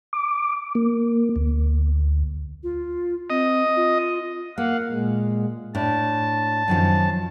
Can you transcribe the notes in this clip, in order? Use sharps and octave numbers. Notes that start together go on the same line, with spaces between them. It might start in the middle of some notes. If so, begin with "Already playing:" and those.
D6
A#3
D2
F4
C4 D#5
F4
A#3 F5 F#5
A#2 G#3
A2 D4 A5
F#2 D#3 F3